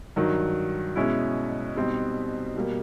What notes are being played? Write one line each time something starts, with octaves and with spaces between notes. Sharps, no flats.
G2 D#3 F#3
B2 G#3 C#4 E4
B2 G3 C4 D#4
B2 G3 A#3